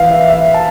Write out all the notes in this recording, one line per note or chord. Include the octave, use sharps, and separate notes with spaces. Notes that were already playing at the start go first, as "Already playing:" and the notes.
Already playing: E3 F5
E5
E5
A5